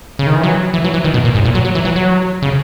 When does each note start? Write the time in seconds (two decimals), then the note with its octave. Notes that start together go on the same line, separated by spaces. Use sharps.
0.19 C#3
0.27 D#3
0.36 E3
0.43 F#3
0.74 E3
0.84 F#3
0.94 E3
1.04 D#3
1.14 B2
1.24 A#2
1.35 G#2
1.45 A#2
1.55 F#3
1.65 F#3
1.75 E3
1.85 F#3
1.96 F#3
2.42 C#3